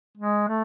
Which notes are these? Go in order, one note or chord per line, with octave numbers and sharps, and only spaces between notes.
G#3
A3